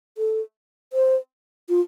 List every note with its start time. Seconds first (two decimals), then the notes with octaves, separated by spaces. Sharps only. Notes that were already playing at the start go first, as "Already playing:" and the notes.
0.18 A4
0.93 C5
1.69 F4